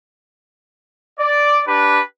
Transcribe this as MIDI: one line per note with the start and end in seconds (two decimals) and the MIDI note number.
1.19 1.62 74
1.67 2.00 62
1.67 2.00 67
1.67 2.00 71